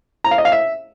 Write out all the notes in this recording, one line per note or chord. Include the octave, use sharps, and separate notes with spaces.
A#5
F5
D#5
F5
E5